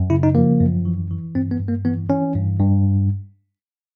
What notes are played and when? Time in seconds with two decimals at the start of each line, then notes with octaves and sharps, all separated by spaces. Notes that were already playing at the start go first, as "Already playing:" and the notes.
Already playing: F#2
0.10 C#3 E4
0.23 D#4
0.35 F3 A#3
0.60 F#2
0.85 E3
1.11 E3
1.35 G2 C4
1.51 B3
1.60 G2
1.69 A#3
1.85 E3 B3
2.09 E3 C#4
2.35 G2
2.59 G2